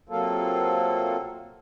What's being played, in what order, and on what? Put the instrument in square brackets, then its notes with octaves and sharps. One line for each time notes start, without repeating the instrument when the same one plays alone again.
[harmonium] C3 F#3 A#3 F4 A4